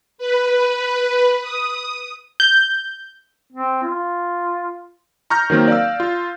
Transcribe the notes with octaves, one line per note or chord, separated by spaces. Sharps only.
B4
D#6
G6
C4
F4
A#5 C#6 F6 G6 A#6
D#3 F#3 A#3 C4
D5 F5 E6
F4